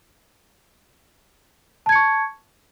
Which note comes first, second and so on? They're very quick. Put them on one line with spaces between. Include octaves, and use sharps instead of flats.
A5 G#6 C#7 C#6